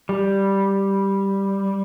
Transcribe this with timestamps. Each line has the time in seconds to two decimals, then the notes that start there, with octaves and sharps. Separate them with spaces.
0.09 G3